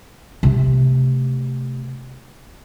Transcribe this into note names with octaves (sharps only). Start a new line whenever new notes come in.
C3 A3